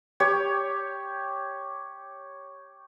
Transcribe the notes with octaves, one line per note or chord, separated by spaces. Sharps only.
G4 C#5